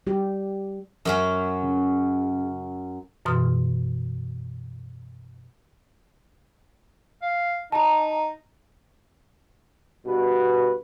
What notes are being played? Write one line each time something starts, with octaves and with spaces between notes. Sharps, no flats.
G3 G4
F#2 F#3 C#4
C#3
F#2 B2 E3 C6 D#6 F6
F5
D#4 A5 A#5
G2 B2 F#4 B4